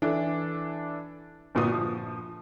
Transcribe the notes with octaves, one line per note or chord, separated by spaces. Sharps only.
E3 D4 A4
G1 A#2 F#4 D#6
F3